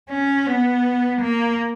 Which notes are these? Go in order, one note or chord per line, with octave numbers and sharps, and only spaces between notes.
C#4
B3
A#3